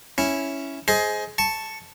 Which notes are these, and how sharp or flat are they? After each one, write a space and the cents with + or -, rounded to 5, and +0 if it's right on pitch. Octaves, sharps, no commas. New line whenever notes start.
C#4 +0 E4 +0
G#4 +20 C5 +0 D#5 +20
A5 +0 C#6 +0